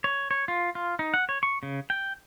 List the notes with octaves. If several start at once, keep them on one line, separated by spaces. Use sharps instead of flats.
C#5
C#5
F4
F4
D#4
F#5
C#5
C#6
C#3
G5